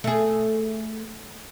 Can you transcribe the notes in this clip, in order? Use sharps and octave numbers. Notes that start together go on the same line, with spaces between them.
A3 G#4